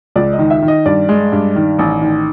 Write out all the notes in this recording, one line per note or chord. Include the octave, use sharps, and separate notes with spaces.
C#2 D5
D#5
D#3
E5
D#3
D#5
G2 D5
G#3
G2
D#3
A1
D#3